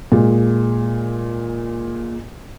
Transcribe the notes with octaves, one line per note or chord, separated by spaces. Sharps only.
A#2 G#3